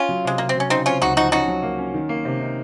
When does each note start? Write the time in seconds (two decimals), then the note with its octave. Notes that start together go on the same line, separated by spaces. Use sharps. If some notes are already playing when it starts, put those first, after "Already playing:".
Already playing: C#4 F4
0.09 F#3
0.25 C3 G#3
0.38 C3 A#3
0.49 C4
0.55 F#3 C#4
0.70 C#3 C4 D#4
0.85 C4 C#4 F4
1.01 C#2 D#4 F#4
1.17 F3 D#4 F#4
1.32 C#4 D#4 F#4
1.48 F#3
1.63 A#3
1.78 C#4
1.94 D#3
2.09 A#3
2.25 C3
2.40 D#4